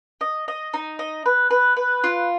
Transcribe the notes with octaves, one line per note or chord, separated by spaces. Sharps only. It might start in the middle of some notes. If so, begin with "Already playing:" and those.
D#5
D#5
D#4
D#5
B4
B4
B4
F4